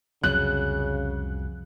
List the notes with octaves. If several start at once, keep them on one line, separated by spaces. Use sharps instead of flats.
C2 F2 C#3 F#3 F#6